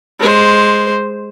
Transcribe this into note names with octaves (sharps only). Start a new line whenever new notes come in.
G#3 C5